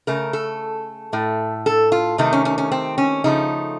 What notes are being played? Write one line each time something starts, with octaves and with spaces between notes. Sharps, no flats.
C#3 A3 A#4
A4
A2 A3
A4
F4
C3 D#3 A3 D#4
C#4
C#4
C#4
C4
C#4
C#3 F3 A3 D#4